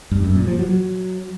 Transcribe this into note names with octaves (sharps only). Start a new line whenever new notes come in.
G2
F#2
A#2
F3
F#3